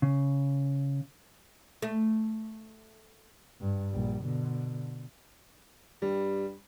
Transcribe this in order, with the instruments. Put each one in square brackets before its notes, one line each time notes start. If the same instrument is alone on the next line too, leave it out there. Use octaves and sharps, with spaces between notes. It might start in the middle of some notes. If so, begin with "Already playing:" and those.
[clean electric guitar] C#3
[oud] A3
[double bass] G2
A#1 G3
B2 D3
[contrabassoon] G2 [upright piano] G3